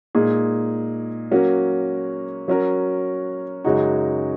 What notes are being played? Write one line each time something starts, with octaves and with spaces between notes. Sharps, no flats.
A#2 G#3 D#4 G#4
F#3 A#3 C#4 F#4 A#4
F#3 C#4 F#4 A#4
F#2 C#3 G#3 D#4 F#4